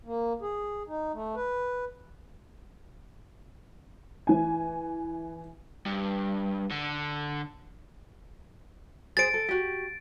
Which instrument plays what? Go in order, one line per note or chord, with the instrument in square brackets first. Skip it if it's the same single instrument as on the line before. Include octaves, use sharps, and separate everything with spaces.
[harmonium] A#3
G#4
D#4
A3
B4
[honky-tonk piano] E3 G#5
[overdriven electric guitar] G2
D3
[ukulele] G#4 C5 [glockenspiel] A6 D7
[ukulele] A4
F#4 G4